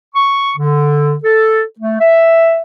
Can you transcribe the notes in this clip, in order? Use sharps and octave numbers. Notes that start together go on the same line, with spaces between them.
C#6
D3
A4
A3
E5